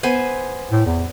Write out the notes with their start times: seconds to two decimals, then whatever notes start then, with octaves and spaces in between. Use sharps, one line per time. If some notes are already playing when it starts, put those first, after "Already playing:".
0.03 B3 C5 G#5
0.71 A2
0.86 E2